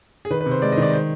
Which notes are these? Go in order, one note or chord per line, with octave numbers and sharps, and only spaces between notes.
G#4
D#3 B4
B4
C3
C5
G#3 D5
D#5
D#3
D5
C5